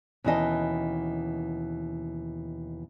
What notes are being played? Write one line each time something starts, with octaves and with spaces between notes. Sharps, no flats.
D#2 B2 E3 C#4 D#5 A5